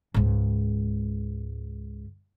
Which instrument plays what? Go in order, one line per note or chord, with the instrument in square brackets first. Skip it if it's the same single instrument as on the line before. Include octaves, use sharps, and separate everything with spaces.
[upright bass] C#2 G#2